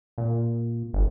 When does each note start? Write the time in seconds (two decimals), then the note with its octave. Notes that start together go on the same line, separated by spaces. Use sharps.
0.18 A#2
0.93 G1